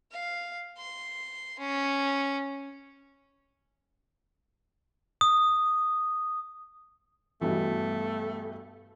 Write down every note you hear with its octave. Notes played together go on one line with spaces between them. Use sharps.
F5
C6
C#4
D#6
G2 B2 E3 A3